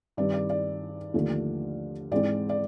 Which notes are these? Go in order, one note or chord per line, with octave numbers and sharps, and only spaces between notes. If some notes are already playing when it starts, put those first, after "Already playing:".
G2 D#3 G3 C4 D5
D5
D5
D#2 D3 F3 A3
G#2 E3 G#3 C4 D5
D5